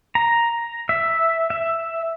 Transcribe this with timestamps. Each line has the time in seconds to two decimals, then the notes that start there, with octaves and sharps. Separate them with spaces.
0.15 A#5
0.89 E5
1.50 E5